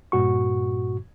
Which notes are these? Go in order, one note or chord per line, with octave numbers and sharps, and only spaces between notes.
G2 A#2 F#4 C#6